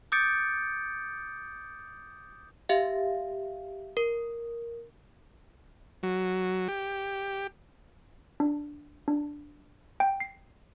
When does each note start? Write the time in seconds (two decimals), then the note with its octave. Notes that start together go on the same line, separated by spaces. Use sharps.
0.12 D6 D#6 G6 A6 C#7 D7
2.69 G4 E5 F5
3.97 A#4
6.03 F#3
6.68 G4
8.40 D4
9.08 D4
10.00 G5
10.20 C7